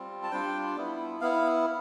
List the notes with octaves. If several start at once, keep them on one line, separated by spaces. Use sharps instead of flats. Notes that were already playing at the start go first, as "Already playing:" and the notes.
Already playing: G3 C4 F4
A5
G3 D4 F4 G5
B3 E4
B3 E4 F5